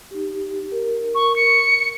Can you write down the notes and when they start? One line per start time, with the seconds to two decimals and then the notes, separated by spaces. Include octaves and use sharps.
0.11 D#4 G4
0.72 A#4
1.15 C#6
1.36 C#7